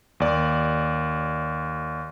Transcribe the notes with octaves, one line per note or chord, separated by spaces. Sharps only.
D#2 D5